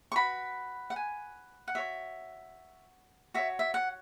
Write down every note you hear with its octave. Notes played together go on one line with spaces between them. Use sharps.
C#6
F#4 B4 B5
F#5
G#5
F#5
F#4 C#5 E5
F#4 C#5 E5
E5
F#5